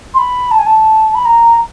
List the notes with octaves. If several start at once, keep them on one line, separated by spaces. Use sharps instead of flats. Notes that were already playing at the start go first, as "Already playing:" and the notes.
C6
B5
A5
G#5
A5
B5
A#5